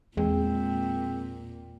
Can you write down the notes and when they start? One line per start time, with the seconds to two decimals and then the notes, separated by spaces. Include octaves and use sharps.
0.17 E2 A#2 G#3 C4